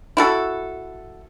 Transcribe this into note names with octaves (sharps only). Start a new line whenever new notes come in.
E4 F#4 A4